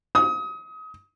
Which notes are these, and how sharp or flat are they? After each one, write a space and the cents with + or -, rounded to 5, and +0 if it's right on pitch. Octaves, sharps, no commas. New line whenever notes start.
D#6 +30